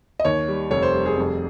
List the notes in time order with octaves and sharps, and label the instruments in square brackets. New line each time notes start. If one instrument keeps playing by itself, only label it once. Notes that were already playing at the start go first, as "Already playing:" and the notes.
[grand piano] D#5
D#2 C#5
G3
F1 C#5
C5
G3
G#4
F2